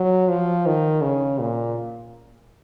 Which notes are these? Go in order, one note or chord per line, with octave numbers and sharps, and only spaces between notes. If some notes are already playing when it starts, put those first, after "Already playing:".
Already playing: F#3
F3
D#3
C#3
A#2